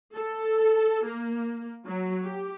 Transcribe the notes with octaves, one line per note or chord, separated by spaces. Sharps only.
A4
A#3
F#3
G4